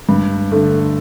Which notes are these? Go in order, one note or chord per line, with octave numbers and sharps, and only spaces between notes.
G2
D3 A3